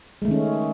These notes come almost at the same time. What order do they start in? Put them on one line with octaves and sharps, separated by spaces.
G#3 A3 D#3 C#4